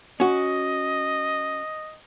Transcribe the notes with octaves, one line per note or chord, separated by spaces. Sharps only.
C#4 F#4 D#5